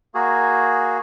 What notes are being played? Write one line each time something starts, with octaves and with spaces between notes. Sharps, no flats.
A#3 F#4 G#4